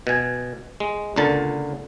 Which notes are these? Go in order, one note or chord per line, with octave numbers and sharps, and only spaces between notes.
B2 G#5
G#3
C#2 A#2 D3 A5